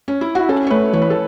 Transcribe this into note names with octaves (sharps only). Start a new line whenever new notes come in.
C#4
E4
E4 F#4
C#4 A4
C#5
A3 B4
E3 C#5
B4
A4